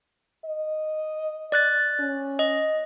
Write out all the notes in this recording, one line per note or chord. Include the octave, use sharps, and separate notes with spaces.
D#5
D5 F#6 A6
C#4
D#5